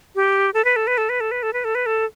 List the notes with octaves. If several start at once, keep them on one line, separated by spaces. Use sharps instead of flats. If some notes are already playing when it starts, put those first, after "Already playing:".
G4
A4
B4
A4
B4
A4
B4
A4
B4
A4
B4
A4
B4
A4